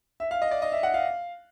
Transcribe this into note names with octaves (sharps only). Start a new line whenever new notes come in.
E5
F5
D#5
D5
D#5
E5
F#5
F5